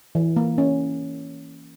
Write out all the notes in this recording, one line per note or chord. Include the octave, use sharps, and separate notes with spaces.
E3
A#3
C#4